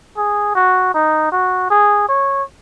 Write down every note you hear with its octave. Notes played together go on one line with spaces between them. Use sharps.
G#4
F#4
D#4
F#4
G#4
C#5